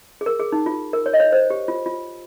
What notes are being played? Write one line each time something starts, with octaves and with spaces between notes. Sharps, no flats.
G#4
A#4
G#4
D#4
F4
A#4
C#5
D#5
C#5
C5
G4
F4
F4